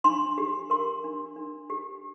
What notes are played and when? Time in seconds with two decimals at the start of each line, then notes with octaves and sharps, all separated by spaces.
0.04 D4 C6
0.38 G4
0.70 A#4 C6
1.04 D4
1.36 D4
1.70 G4